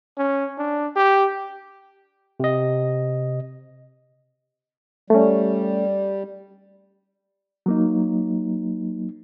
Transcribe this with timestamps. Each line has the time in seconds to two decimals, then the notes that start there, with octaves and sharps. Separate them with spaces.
0.18 C#4
0.58 D4
0.96 G4
2.40 C3 D#5
5.10 G3 A3 C#4
7.66 F#3 A#3 D#4